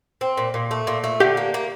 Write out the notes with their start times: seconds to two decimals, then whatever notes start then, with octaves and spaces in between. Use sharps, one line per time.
0.21 C4
0.37 A#2
0.54 A#2
0.71 A3
0.87 A#2
1.04 A3
1.20 D3 G4
1.37 A#3
1.54 A#3